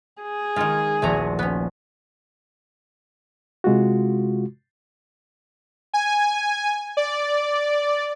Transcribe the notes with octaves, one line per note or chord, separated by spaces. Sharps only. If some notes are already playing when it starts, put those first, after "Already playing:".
G#4
D#3 G#3 D#4 F4
D#1 A#1 A3 F#4 A#5
B3 C#4
C3 G#3 F4 F#4
G#5
D5